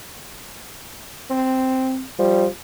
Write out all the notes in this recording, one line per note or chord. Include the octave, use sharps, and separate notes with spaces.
C4
F3 G3